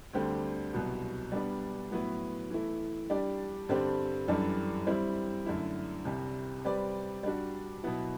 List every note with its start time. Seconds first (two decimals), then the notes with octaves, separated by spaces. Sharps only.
0.13 D2 D3 G3 C4 G4
0.73 C2 B2 F#3 B3
1.32 G3 B3 D4
1.91 A2 F#3 B3 E4 B4
2.51 E3 A3 E4
3.10 G3 D4 G4 D5
3.69 G2 D3 G3 C4 G4
4.28 F#2 E3 G3 D4 A4
4.87 G3 C4 E4
5.46 F#2 D3 A3 E4
6.05 C2 C3 G3
6.65 G3 C4 G4 B4 D5
7.23 G3 D4 F#4
7.84 B2 F#3 B3 E4